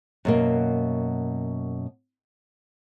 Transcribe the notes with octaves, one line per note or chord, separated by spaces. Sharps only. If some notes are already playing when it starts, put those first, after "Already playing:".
F#2 B2 A#3